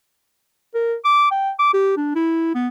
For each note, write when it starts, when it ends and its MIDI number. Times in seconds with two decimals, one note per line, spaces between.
0.74 0.95 70
1.05 1.30 86
1.31 1.51 79
1.59 1.70 86
1.74 1.94 67
1.97 2.12 62
2.15 2.51 64
2.55 2.68 59